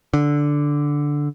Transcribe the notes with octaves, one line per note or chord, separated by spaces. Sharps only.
D3